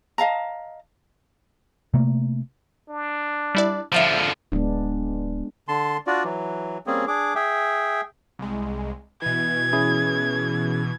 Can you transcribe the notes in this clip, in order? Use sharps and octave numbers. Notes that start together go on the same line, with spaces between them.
D#5 F5 A5 A#5
C3 A3 A#3
D4
G3 E4 D5
D3 F3 E5 F5 D7
D1 G#3 B3 D4
D3 A5 C6
D4 F4 F#4 D5
E3 F#3
G3 A#3 C4 C#4 G#4
D4 G#4 D6
G#4 E5 G5
C2 G#3
B2 E3 G#6
C#4 E4 G#4